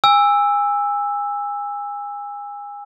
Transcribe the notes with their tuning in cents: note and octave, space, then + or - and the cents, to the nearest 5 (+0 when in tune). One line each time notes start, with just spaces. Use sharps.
G#5 -30 E6 +0